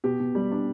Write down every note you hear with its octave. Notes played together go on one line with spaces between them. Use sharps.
B2 G4
B2
G3
D4